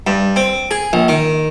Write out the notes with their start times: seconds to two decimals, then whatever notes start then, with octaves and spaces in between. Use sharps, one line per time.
0.07 G2
0.36 C4
0.71 G#4
0.93 A#1
1.08 D#3